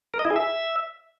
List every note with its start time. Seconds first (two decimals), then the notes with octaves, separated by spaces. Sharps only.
0.14 A#4
0.19 D#5
0.25 E4
0.30 G#4
0.36 E5